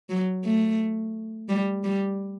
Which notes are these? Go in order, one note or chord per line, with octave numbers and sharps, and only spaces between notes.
F#3
A3
G3
G3